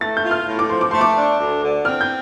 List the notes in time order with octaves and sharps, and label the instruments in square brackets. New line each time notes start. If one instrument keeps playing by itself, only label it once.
[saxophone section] A3 [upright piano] A6
[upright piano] G6
[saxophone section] F4
[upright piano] F6
[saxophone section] A2
[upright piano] D6
[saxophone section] F3 [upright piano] C6
[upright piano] D6
[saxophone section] A3 [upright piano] C6
[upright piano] D6
[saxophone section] D4
D2
D3
[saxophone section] C4 [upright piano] F6
[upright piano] G6